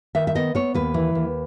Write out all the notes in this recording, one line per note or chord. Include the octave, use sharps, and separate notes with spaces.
D#3 E5
E5
B3 D#5
B3 C#5
D#2 B4
E3
D#2